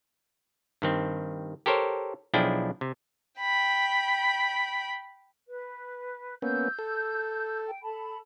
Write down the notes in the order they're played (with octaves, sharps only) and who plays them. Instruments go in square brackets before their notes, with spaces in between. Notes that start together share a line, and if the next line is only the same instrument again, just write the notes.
[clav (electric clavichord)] G2 D#3 C4
G4 A4 A#4 C5 C#5
B1 F3 D4 E4 G#4 G5
C3
[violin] G5 B5
[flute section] B4
[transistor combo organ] A#3 B3 C#4 [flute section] E6 G6
[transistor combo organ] A4
[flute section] G5
A4 A5 B5